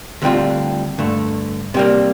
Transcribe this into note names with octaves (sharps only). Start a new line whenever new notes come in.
D2 D3 G3 C4 F4
G2 D3 A3
C3 G3 A#3